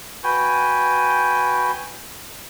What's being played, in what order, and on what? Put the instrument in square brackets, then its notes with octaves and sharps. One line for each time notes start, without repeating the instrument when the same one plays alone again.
[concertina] F#4 B4 G5 G#5